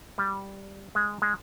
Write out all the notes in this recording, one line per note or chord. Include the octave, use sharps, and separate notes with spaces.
G3
G#3
G#3